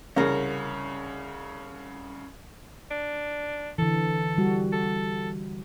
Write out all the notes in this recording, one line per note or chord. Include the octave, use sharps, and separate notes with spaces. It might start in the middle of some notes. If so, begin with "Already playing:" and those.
C2 C#3 C#4 A#4
D4
D3 E3 A4
G3 F#4
A4